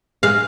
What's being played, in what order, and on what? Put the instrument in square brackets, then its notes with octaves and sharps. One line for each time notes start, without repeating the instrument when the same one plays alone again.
[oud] G#3 [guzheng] F5